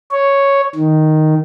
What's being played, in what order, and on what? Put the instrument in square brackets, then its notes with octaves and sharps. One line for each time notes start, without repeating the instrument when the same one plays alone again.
[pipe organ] C#5
D#3